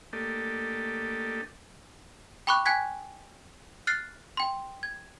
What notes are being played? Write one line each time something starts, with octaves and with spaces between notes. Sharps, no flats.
A3 A#3 D4 G4 A4 D#5
G5 B5 C#6 D6 F#6
G5 G#5 F#6 G#6 B6
F6 F#6 A6 C7
G5 C6
G#6